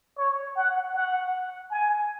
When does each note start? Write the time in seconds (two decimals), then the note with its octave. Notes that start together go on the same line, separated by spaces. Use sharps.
0.18 C#5
0.57 F#5
0.94 F#5
1.70 G#5